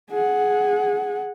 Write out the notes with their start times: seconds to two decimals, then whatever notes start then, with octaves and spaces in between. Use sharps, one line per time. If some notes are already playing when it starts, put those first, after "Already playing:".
0.10 G#4 F#5